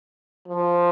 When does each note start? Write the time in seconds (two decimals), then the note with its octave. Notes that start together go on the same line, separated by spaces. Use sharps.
0.48 F3